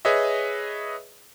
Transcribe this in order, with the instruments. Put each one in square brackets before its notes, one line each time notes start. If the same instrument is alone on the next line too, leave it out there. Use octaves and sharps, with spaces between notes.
[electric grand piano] G#4 B4 C#5 D#5 E5